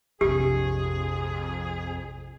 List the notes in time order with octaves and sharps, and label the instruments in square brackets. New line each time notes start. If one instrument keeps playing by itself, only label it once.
[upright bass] A#1 C3 [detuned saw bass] F2 [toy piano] G4 [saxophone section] G#4